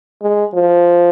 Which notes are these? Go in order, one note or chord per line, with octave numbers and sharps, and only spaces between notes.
G#3
F3